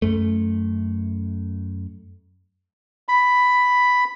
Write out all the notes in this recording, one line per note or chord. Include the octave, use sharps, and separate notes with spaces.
F#2 A3
B5